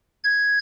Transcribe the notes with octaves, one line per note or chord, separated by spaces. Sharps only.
G#6